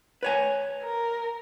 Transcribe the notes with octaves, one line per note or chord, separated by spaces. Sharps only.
B4 C#5 G#5
A#4